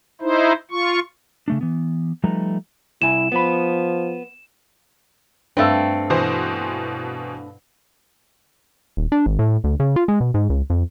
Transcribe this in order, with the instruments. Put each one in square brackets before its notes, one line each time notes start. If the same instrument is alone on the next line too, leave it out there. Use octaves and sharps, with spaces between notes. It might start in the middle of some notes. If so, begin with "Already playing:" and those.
[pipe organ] D#4 E4 C5
F4 C#6
[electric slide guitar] C#3 A3 D4
E3 B3
F3 G3 A3 D#4 B4 A#5
[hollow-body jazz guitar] C2 G#5 [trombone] E4 [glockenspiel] E7
[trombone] F3 [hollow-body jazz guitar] B3 B5
[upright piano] G2 F5 E6 [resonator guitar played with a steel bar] A3 C4
[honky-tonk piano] B2 E3 C5
[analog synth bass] D#1
D4
G#1
A2
D2
C#3
F4
G#3
B2
G#2
C#2
F2